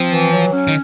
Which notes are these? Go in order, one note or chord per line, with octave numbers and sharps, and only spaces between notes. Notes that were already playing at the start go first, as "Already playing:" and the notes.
Already playing: F3 C4
E3
F#3
C#4
D#3